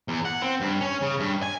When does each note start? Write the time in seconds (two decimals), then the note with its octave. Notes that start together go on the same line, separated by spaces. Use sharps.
0.08 E2
0.25 F#5
0.42 C4
0.61 G2
0.81 C#4
1.02 C#3
1.20 G2
1.42 G#5